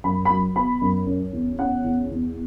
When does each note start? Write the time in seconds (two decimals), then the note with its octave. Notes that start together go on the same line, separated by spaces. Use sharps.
0.04 F#2 B5
0.25 B5
0.30 F#3
0.56 B3 B5
0.81 F#2
1.07 C#4
1.33 E2
1.59 C#4 F#5
1.84 E2
2.11 E2